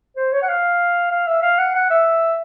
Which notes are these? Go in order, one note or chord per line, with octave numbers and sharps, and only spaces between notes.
C5
C#5
F#5
F5
F5
E5
F5
F#5
F#5
E5